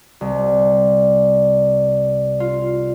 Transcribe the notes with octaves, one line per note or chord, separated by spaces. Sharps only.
C2
F4